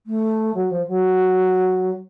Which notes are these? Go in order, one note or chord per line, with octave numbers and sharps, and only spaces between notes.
A3
F#3
F3
F#3